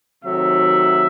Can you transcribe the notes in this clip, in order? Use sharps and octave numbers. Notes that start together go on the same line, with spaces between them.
C3 D#3 F#3 A3 E5